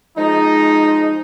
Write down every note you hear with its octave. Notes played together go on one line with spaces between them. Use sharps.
F3 G#3 D#4